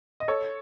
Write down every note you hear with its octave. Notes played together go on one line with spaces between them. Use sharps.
D#5
A4 C#5